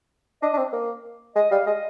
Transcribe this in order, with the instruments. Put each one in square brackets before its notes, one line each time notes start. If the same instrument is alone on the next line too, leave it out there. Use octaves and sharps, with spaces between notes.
[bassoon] D4 [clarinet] D#5
[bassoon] D4
C4
A#3
[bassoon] G#3 [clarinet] D#5
[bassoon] G3 [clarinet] F5
[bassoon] G#3 [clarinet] D#5